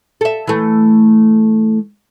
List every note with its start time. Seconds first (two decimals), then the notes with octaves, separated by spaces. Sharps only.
0.21 A4 E5
0.47 E3 A3